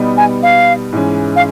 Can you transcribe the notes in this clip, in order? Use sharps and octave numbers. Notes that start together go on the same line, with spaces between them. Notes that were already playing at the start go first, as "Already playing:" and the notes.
Already playing: B2 G3 B3 D#4
G#5
F5
G#2 E3 G#3 C#4
F5